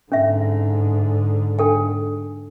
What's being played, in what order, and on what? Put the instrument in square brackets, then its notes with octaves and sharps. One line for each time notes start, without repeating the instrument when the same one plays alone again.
[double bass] G#2 D3 [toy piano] C#4 E5
[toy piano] D4 A4 G5